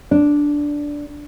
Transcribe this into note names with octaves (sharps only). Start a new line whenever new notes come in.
D4